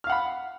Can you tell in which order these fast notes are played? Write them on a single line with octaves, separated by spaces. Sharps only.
F6 F5 F#5 B5